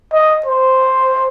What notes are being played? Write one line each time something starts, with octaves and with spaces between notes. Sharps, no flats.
D#5
C5